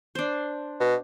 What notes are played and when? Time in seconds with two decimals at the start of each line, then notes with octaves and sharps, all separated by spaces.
0.15 D4 C5
0.80 B2